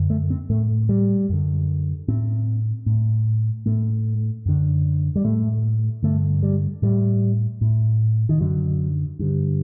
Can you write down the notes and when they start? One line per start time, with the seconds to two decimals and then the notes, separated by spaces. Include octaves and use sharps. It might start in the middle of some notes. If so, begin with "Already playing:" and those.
Already playing: F#2 D3
0.10 A3
0.30 C4
0.50 A2 A3
0.89 G3
1.29 F#2 D3
2.08 A2 C4
2.86 A2
3.66 A2 A3
4.46 F#2 D3
5.16 G3
5.24 A2 A3
6.03 G2 D3 A3
6.43 G3
6.82 A2 G3
7.61 A2
8.29 D#3
8.40 F#2 D3 F#3
9.19 G2 D3